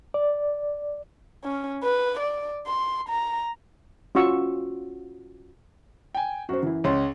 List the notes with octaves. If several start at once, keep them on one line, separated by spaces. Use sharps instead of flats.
D5
C#4
B4
D5
C6
A#5
C#4 F4 F#4 C#6 E6
G5 G#5
F#2 F#4 C5
E3 E4
C#2 C#5 C6